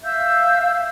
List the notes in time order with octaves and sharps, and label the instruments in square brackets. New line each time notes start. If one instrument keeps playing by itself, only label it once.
[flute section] E5 F5 E6 G6